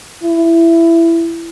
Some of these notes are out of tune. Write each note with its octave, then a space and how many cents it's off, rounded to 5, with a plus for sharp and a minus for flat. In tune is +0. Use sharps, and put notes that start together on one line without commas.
E4 +15